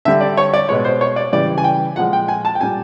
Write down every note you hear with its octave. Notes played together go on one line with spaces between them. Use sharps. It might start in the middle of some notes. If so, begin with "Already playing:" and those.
D3 G3 E5
D5
C#5
D5
B2 G#3 C#5
C5
C#5
D5
C#3 E3 G3 D5
G#5
G5
A#2 F3 G#3 F#5
G5
G#5
A5
G5
A#2 G3 G#5